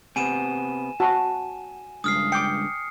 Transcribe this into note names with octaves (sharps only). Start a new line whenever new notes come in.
C3 B3 G#5 D#7 E7
F#4 A5
C#2 G2 D#6 F6 C7
G5 D6 C#7